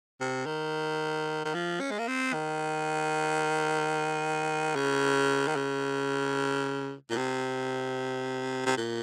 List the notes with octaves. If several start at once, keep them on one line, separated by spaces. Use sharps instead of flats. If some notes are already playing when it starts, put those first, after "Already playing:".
C3
D#3
D#3
F3
C#4
G#3
A#3
C4
D#3
C#3
D#3
C#3
A#2
C3
C3
A#2